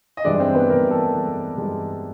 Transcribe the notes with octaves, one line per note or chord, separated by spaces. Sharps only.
D#5
G2 E3 G#3 D4 D5
C4 C5
B3 B4
G2 E3 G#3 A#3 A#4
A3 A4
G2 E3 G#3
G2 E3 G#3